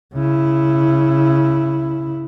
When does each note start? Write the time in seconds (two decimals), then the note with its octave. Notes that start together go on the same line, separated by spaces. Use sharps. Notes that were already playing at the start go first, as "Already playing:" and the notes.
0.15 C#3 E4